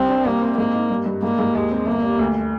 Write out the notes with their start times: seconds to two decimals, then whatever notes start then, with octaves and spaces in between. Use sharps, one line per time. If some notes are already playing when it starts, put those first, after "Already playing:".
Already playing: C2 C4
0.09 D4
0.25 C2 A#3
0.42 C4
0.57 G#2 A#3
0.74 D#4
0.91 G2
1.06 G2
1.23 G#2 A#3
1.39 G#2
1.55 D#2 G#3
1.71 C4
1.87 G1 A#3
2.03 G3
2.19 D2